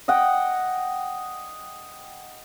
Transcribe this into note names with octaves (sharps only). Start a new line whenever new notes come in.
D#5 F#5 G5